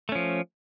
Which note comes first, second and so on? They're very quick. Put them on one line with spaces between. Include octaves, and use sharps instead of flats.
A3 C#4 F3